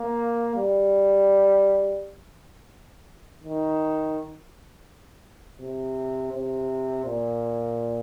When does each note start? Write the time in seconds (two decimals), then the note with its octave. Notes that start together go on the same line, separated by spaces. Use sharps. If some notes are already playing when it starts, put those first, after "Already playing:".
Already playing: A#3
0.56 G3
3.44 D#3
5.60 C3
6.32 C3
7.04 A#2